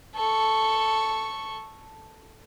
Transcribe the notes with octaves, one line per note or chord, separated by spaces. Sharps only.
A4 C#6